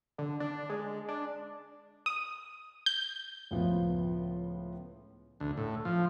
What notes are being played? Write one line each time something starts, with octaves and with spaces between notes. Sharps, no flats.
D3
D4
G#3
D4
D#6
G6
C#2 A2 F3 B3
D2
A2
F3